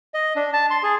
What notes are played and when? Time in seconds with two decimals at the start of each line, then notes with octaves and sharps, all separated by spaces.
0.14 D#5
0.36 D4
0.53 A5
0.70 C6
0.83 G#4